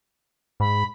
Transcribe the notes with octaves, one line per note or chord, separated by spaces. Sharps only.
G#2 B5